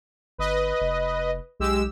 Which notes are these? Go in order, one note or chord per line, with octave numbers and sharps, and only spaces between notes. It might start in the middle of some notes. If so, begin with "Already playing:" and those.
G1 B4 D#5
F1
B1 G#3 G4 E6